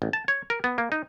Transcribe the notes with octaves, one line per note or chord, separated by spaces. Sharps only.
A1
A5
C#5
A#4
B3
A#3
D#4